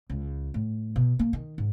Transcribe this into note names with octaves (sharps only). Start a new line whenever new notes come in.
C#2
A2
B2
A#3
D#3
G#2